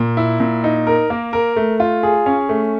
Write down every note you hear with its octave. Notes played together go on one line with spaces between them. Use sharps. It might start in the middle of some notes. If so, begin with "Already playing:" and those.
Already playing: A#2
E4
A#2
D#4
A#4
A#3
A#4
A3
F4
G#4
C#4
A3